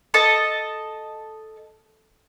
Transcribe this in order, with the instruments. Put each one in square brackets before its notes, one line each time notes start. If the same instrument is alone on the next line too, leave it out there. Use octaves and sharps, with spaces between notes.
[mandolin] A4 D#5 A5